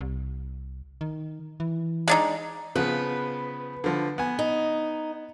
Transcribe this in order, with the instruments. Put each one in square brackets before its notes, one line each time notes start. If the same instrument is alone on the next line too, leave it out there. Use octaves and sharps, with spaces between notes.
[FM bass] C2
D#3
E3
[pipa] G#3 D4 D#4
[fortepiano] C#3 F3 B3 [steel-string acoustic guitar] B4
[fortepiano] D3 F3
B3 G#5
[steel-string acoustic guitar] D#4